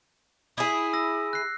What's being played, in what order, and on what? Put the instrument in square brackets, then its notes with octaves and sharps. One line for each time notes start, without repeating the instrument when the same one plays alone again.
[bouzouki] E4 G#4 [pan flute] D#6
[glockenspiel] E6 A#6
F#6 C7